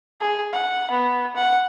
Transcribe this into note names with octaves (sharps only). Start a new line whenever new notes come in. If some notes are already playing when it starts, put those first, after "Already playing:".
G#4
F#5
B3
F#5